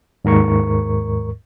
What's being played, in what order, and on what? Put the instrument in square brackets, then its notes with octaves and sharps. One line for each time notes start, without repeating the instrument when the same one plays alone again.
[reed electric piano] D#2 G#2 A#4 C#6